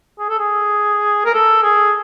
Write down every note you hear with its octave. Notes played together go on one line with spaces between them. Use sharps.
G#4
A4
G#4
A#4
A4
G#4